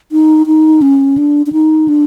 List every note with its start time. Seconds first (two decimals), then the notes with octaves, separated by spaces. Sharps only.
0.12 D#4
0.47 D#4
0.82 C#4
1.18 D4
1.46 D4
1.53 D#4
1.88 D4